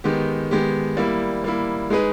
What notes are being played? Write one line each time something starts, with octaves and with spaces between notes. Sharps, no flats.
D#3 G#3 B3 G4
D#3 G#3 B3 G4
G3 A#3 E4
G3 A#3 E4
G#3 D#4 G#4 B4